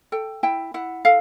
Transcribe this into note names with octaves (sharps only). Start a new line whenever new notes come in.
A4 G5
E4 G5
E4 F#5
A4 F5